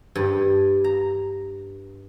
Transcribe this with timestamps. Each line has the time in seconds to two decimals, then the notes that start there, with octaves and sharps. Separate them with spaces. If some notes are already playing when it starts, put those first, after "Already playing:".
0.16 G2
0.84 A#5